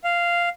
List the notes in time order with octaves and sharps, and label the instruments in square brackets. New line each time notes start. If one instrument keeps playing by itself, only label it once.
[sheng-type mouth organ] F5